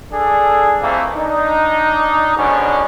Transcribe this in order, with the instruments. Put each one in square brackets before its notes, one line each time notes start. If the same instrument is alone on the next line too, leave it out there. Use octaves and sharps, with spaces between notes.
[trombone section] D4 G#4 A4
F2 E3 A3 A#3 C4
D4 D#4
G#2 B2 D3 C#4 D4